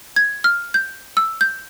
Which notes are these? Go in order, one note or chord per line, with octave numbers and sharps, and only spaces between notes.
G#6
F6
G6
E6
G6